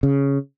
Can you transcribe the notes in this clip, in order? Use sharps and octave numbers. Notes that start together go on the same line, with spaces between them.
C#3